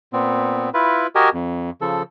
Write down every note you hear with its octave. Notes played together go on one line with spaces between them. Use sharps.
A#2 B3 C4
E4 F4 B4
F#4 G4 A#4 D#5 G#5
F2
C#3 F3 A4